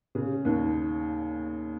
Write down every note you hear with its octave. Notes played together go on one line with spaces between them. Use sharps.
C#3
D#2 D#3